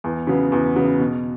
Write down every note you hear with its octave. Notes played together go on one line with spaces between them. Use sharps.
E2
C#3 F#3 B3
E2
C#3 F#3 B3
B2